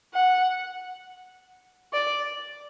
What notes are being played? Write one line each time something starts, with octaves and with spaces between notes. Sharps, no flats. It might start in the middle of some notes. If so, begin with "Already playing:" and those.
F#5
D5